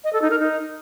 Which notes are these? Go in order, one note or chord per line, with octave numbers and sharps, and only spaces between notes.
D#5
A4
D#4
A#4
D#4